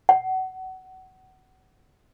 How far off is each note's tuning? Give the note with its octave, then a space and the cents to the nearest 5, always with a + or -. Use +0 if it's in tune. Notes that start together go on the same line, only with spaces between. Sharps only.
F#5 +25